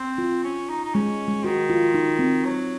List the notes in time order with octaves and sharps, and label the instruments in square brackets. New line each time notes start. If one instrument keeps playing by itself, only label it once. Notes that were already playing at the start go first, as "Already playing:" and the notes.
Already playing: [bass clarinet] C4
[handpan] F4
[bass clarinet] C#4
D#4
D#4
[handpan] G#3 [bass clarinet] C#4
[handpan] G#3
[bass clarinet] D#3 [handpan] F#4
[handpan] F4
D#4
C4
[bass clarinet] F#3